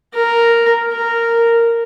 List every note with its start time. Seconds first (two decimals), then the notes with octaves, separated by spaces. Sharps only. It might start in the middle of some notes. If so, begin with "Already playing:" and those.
0.14 A#4
0.93 A#4